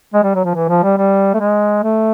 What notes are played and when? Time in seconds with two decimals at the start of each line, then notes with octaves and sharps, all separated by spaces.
0.14 G#3
0.24 G3
0.35 F#3
0.44 F3
0.55 E3
0.69 F3
0.83 G3
0.98 G3
1.34 A3
1.40 G#3
1.83 A3